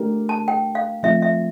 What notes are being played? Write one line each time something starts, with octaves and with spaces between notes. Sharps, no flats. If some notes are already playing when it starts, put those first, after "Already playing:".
Already playing: A3 D4 G4 A#4
A5
G5
F5
F3 A3 C4 F4 E5
E5